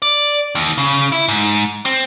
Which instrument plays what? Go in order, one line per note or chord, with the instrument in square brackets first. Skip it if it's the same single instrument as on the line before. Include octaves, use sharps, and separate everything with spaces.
[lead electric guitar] D5
D#2
C#3
E4
G#2
C4